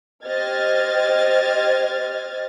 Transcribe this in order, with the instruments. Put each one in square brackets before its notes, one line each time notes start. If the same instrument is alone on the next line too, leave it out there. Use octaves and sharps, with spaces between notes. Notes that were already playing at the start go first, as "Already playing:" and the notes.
[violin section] G4 C5 D#5 F6 G#6 A6